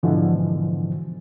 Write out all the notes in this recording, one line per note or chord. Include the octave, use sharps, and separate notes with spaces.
G#2 B2 D3 E3 F3